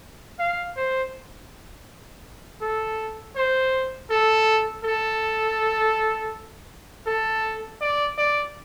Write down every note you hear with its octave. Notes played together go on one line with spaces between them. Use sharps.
F5
C5
A4
C5
A4
A4
A4
D5
D5